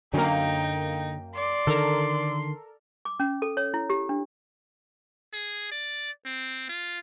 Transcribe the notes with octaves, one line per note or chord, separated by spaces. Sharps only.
F#2 D3 A#3 D#4 G5
D5 C6
D3 D#3 A4 A#4
D6
C#4
A4
C#5
E4
G4
D4
G#4
D5
C4
F4